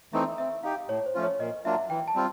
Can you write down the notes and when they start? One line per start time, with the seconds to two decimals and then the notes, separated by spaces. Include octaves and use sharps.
0.13 E3 A3 C4 D#4 E5
0.38 C4 E5
0.63 D#4 G4 F5
0.89 A2 C#5
1.06 C5
1.14 F3 A3 C#4 F4
1.23 C#5
1.40 A#2 D#5
1.65 F#3 A#3 D4 F4 E5
1.90 E3 G5
2.08 A5
2.15 G3 C4 F4